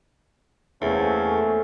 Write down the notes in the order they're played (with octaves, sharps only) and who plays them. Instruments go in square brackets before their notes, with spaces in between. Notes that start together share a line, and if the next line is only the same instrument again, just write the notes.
[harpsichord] E2 [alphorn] A3 [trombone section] A#3 C4 C#4 [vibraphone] A4 G#5